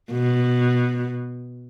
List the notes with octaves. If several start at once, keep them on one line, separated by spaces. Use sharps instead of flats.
B2